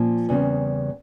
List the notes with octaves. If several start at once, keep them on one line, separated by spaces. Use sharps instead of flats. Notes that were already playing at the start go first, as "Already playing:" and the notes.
Already playing: A#2 F3 A#3 C#4
E2 C#3 G3 C4